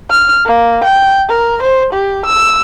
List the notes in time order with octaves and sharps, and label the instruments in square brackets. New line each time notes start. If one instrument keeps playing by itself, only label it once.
[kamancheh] F6
A#3
G5
A#4
C5
G4
E6